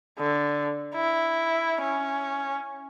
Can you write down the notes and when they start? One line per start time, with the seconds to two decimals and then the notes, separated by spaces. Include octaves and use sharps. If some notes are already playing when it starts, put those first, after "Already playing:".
0.19 D3
0.95 E4
1.81 C#4